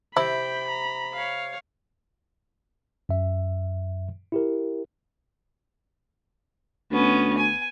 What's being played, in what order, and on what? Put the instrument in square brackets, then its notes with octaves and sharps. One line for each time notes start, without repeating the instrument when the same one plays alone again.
[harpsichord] C3 [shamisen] E4 [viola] G5 [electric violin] B5
[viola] A#5
C#5 F5
[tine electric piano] F#2 E5
E4 G4 A#4
[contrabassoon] D2 [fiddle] B3 C#4
[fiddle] G#5